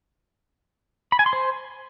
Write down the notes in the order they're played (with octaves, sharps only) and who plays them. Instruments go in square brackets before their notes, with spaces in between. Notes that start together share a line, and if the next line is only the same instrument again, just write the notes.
[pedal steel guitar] B5
G#5
C6
C5